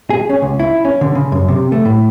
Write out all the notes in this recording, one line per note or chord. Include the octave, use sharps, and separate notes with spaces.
G#4
C#4
C#2
E4
C#4
D3
C#3
F#2
C3
A3
A2